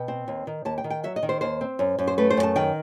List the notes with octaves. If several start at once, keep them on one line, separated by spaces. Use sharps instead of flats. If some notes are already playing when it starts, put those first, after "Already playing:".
Already playing: B2 G5
C4
D#2
D#3
D#2 A5
G5
D#3
G5
F#3 E5
D#5
D#3
C5
D#2 C5
C4
F#2
F#2
C5
A3 B4
C5
F#2
A5
D#3 G5